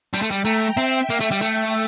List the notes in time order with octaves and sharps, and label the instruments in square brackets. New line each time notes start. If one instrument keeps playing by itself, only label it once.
[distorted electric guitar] G3 [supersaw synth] A5 C6
[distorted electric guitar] A3
G3
[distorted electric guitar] A3 [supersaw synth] G5 A#5
[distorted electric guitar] C4 [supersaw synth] E5 G5
[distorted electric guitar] A#3
A3
G3
A3